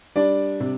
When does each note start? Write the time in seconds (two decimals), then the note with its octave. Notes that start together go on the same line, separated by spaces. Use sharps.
0.15 G3 D4 D5
0.60 C3